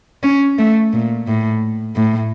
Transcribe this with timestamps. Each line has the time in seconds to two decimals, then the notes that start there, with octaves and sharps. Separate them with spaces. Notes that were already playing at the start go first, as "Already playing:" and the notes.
0.23 C#4
0.58 A3
0.93 A#2
1.27 A2
1.96 A2